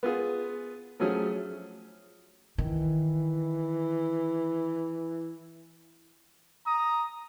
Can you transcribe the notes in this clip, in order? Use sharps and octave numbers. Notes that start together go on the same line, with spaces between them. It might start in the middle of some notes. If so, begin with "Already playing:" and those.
B3 F4 G#4
F3 F#3 A3 C#4 G#4
D#3 E3
A#5 D#6